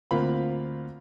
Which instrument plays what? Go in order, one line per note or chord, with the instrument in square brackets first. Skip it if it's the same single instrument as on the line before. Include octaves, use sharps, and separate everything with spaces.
[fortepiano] D2 A#3 C4 F4 B5